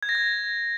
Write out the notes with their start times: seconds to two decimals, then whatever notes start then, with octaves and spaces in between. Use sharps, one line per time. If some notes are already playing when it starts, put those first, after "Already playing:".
0.03 G#6
0.09 A#6
0.15 G#6